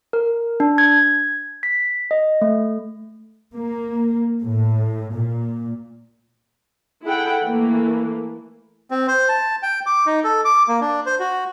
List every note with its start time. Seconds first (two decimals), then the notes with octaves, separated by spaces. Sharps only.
0.13 A#4
0.60 D4
0.78 G#6
1.63 B6
2.11 D#5
2.42 A3
3.53 A#3
4.43 A2
5.14 A#2
7.04 E4 G#4 A4 F#5 G5
7.42 E3 A3 A#3
8.91 C4
9.08 C5
9.29 A5
9.63 G5
9.86 D6
10.06 D#4
10.24 A4
10.45 D6
10.68 A#3
10.81 D4
11.06 C5
11.20 F#4